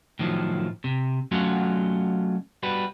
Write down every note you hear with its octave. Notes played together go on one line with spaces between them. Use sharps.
A2 D#3 F3 F#3
C3
F#3 A3 C#4 F4 F#4 F#5
G3 F#4 B4